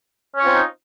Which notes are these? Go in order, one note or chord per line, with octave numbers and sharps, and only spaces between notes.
C4 C#4 D#4 F4 C#5